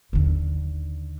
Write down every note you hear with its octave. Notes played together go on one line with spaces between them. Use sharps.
D#2 D3